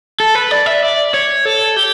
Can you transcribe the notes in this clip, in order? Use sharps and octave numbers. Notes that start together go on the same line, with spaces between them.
A4
B4
D5
E5
D5
C#5
A4
G4